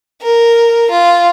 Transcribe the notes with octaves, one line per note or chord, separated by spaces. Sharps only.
A#4
F4